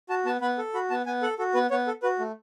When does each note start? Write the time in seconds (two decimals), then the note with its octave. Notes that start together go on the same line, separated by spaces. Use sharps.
0.09 F#4 A5
0.25 B3 A5
0.41 B3 B5
0.58 A4
0.74 F#4 B5
0.90 B3 A5
1.06 B3 G#5
1.22 A4 F#5
1.38 F#4 A4
1.54 B3 B4
1.70 B3 C#5
1.87 A4
2.03 F#4 B4
2.19 A3